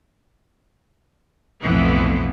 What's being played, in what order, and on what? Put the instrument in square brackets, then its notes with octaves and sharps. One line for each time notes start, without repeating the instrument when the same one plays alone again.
[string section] B1 F2 A2 E3 B3